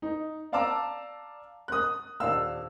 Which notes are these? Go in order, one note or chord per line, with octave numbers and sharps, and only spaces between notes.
D#4
D5 F5 A5 A#5 D6 E6
D#6 F#6
D#1 D4 F5 E6